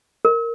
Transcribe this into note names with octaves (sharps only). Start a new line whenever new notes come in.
A#4